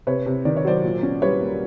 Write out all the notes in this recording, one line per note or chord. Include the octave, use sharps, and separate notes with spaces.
C3 B4 C#5
C3
D#3 D5
C#5
F#3 C5 D5
A#2
C#4
G3 B4 C#5
A#3